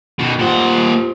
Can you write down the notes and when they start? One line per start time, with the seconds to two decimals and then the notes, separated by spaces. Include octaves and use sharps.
0.19 B2 D#3
0.39 A#2 F4 G4 C5 F#5